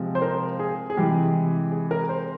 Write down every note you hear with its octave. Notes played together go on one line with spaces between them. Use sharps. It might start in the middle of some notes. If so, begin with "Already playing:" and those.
Already playing: C3 F3 G#3
C5
A#4
G#4
G#4
C3 E3 G#3 G4
G#4
A#4
C5